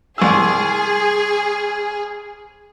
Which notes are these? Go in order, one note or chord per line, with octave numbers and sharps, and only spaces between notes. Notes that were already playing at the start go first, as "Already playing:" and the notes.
C2 G#4 E6